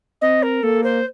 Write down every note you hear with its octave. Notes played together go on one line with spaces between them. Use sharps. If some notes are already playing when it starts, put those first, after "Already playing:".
C4 D#5
A#4
A#3 A4
C5